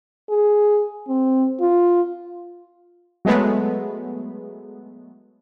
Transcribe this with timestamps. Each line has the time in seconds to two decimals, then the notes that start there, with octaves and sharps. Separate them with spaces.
0.30 G#4
1.08 C4
1.61 F4
3.25 F#3 G#3 A3 B3